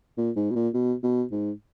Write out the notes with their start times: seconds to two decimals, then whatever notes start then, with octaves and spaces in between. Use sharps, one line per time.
0.17 A#2
0.36 G#2
0.51 B2
0.55 A#2
0.74 B2
1.03 B2
1.31 G#2